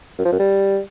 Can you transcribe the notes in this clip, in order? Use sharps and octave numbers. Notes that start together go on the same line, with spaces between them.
F#2
F3
F#2
G3